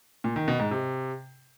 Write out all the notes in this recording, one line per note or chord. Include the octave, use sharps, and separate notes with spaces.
A#2
D#3
B2
G#2
C3